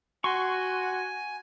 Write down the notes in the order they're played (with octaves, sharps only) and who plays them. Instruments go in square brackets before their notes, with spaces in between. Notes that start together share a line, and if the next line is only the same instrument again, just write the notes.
[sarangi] F#4 [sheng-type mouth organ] G#5 [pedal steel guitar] C6 C#6